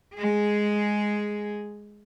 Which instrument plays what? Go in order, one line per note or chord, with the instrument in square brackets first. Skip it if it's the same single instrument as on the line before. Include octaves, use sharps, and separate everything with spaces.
[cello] G#3 G#4